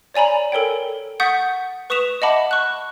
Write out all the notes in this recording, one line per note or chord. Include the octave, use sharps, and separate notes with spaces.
C#5 D5 G#5 A#5 B5
A4 A#4 C#5 G5
F#5 C#6 D#6 G6 A6 B6
B4 C#6 D#6 B6 E7 F7
D#5 E5 F#5 A5 B5 D6
C#6 F#6